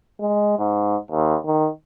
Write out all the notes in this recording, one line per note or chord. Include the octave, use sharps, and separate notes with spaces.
G#3
G#2
D#2
D#3